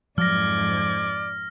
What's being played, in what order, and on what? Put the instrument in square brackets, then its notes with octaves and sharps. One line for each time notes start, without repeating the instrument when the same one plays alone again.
[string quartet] F2 G#2 G#6 [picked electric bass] F3 F#3 [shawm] D5 [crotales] F6 A#6